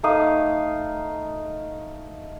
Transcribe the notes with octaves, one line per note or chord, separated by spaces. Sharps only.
A3 D#4 F5 D#6